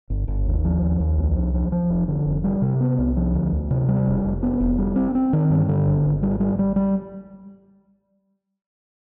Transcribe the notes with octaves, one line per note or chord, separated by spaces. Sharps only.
G1
G1
D#2
F3
D#2
D#2
C2
F3
F3
F3
F1
D3
F1
G3
C3
B3
C2
F3
D2
D2
C3
G3
F1
F1
B3
F1
G3
C4
C4
D#3
G2
D3
G#1
G#1
G3
G3
G3
G3